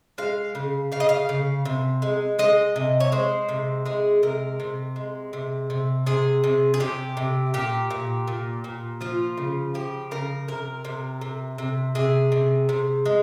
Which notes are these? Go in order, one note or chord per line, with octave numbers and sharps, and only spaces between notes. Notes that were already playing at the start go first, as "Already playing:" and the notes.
G#3 F5
C#3
C#3 F5
D#5
F5
C#3
C3
G#3
G#3 D#5
C3
C#5
G#3 C5
C3
G#3 G#4
C3 A#4
C3
G#3
C3
C3
C3 G#4
C3
G#4
C3 G4
C3
A#2 G4
A#2
A#2
A#2
F3 F4
C#3
F3 G4
C#3 A#4
C3 A#4
C3
C3
C3
C3 G#4
C3
C3
G#3